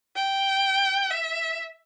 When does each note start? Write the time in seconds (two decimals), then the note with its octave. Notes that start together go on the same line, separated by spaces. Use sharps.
0.16 G5
1.11 E5